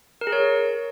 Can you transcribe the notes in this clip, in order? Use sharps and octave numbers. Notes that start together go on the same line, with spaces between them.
A#4
G#4
C#5